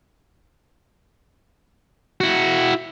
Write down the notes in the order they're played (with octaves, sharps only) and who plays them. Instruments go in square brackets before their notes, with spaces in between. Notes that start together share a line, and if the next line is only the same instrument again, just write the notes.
[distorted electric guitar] E4 F#4